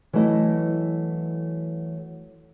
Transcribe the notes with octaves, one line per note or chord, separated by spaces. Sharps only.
E3 F#3 A3 E4 D#5